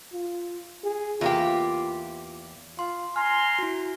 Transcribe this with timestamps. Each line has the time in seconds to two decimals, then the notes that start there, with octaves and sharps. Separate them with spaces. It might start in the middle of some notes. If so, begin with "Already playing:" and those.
0.13 F4
0.84 G#4
1.21 E2 A#3 F4 G4
2.79 F4 C6
3.16 G#5 A#5 C6 F6
3.59 E4 F#4